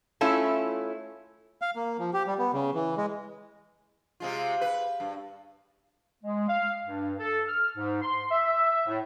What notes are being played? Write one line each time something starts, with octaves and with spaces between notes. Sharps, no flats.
A3 C#4 E4 F4 A4
F5
A#3
F3
G4
G3
B3
C#3
E3
G#3
C3 G#3 F4
B4
G2
G#3
F5
G2
A4
F6
G#2
C6
E5
A2